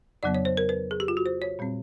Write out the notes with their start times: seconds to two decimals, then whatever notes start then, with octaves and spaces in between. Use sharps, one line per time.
0.23 F2 C#3 F#3 B3 D5
0.35 C#5
0.45 C5
0.57 A#4
0.69 B4
0.91 G#4
1.00 G4
1.08 F4
1.17 F#4
1.26 C5
1.42 C#5
1.59 A#2 G3 C4